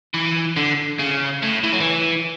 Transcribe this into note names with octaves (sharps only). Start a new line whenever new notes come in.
E3
D3
C#3
A2
E3
F#3
E3